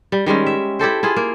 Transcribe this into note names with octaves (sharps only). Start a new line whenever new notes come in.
G3
D#3 G3 G#3 C#4
E5
E4 G4 A4 C5
E4 F4 G#4
A#3